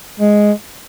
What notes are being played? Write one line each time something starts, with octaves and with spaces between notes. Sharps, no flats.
G#3